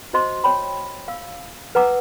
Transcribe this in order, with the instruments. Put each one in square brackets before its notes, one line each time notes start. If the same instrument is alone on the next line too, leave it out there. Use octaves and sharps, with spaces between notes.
[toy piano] E4 F#4 C5 D#5 C6
C#5 G5 B5
F5 E6
B4 F#5 A#5 D6 E6